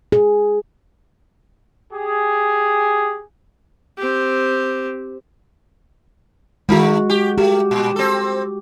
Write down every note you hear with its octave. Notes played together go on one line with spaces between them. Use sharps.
G#4
G4 G#4
C4 G4
D#3 G#3 A3 F#4
G4
A3 G4
A#2
C4 A4